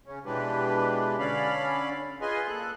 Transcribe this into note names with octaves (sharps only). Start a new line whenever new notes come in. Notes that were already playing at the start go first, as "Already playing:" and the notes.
C#3 C#4
B2 E3 G#3 D4 G4 B4
D3 C#4 D5 F5 B5
F4 G#4 B4 D#5 G#5 C6
A#2 A4 F#6